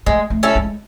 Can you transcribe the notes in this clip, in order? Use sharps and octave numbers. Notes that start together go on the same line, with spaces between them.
G#3 A3
A3
C#4 E4 A4
G#3